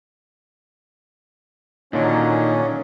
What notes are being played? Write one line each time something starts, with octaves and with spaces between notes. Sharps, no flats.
A#2 D3 D#3 F#3 A#3 C#4 D#4